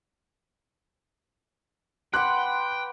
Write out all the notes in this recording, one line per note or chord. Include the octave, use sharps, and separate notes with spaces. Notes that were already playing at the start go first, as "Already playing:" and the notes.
G4 B4 F#5 G5 C6 F#6